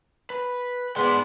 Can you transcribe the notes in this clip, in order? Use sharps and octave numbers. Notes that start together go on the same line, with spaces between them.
B4
G#2 G#3 B3 D4 C6